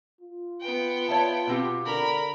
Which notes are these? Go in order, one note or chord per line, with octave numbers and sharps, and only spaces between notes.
F4
B3 G5
C#5 E5 A5
B2 C4 G4
D3 A#4 B5